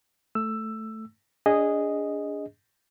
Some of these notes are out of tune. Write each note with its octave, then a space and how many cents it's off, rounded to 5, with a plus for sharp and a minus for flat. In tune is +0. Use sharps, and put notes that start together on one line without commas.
A3 +0 E6 +10
D4 -30 G#4 -10 D#5 +0